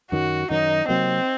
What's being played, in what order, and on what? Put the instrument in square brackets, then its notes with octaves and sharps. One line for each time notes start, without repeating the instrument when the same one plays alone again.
[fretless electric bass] F#2 D#3 F#3 [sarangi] F#4
[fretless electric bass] F#2 D#3 F#3 [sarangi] D#4
[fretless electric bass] C3 F#3 A#3 [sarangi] C4